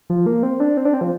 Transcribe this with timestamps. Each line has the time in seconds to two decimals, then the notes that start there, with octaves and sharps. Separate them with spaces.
0.10 F3
0.26 A#3
0.43 C4
0.60 D4
0.77 C4
0.85 D4
0.94 C4
1.01 F3